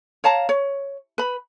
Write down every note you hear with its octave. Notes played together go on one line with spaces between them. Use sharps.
C#5 F5 A5 A#5
C#5
B4 B5